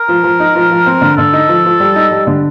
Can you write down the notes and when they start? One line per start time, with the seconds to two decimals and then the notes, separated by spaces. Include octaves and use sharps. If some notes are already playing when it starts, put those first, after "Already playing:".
Already playing: A#4
0.08 F3
0.23 F3
0.40 D#4
0.55 F3
0.70 F3
0.86 C4
1.01 D3
1.17 D3 A4
1.33 D#4
1.48 F3
1.65 F3
1.80 G3
1.96 D#4
2.11 G3
2.27 D3